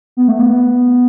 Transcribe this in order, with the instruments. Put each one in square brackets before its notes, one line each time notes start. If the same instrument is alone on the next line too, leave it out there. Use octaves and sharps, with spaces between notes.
[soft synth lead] B3
A3
B3